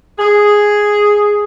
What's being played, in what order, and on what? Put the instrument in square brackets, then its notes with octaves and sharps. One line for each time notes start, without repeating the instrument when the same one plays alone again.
[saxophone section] G#4